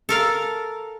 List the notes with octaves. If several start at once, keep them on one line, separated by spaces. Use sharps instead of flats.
A4 A#4 F5